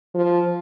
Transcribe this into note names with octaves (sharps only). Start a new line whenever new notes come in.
F3